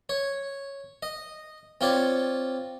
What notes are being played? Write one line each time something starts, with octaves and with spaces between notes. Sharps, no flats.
C#5
D#5
C4 F4 C#5 D5